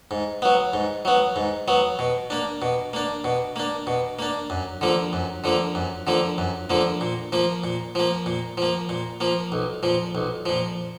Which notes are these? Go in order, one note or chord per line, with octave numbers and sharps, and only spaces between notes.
G#2
F#3 B3
G#2
F#3 B3
G#2
F#3 B3
B2
A#3 D4
B2
A#3 D4
B2
A#3 D4
B2
A#3 D4
F#2
D3 F3 A#3
F#2
D3 F3 A#3
F#2
D3 F3 A#3
F#2
D3 F3 A#3
A#2
F3 A#3
A#2
F3 A#3
A#2
F3 A#3
A#2
F3 A#3
B1
A#2 F3
B1
A#2 F3